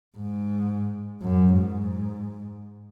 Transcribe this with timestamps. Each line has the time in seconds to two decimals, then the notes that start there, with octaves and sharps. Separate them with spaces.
0.18 G#2
1.21 F#2
1.54 G#2